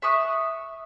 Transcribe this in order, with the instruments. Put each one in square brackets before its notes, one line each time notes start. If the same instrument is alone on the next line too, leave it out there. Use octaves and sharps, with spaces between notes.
[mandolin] E5 C#6 D#6 F#6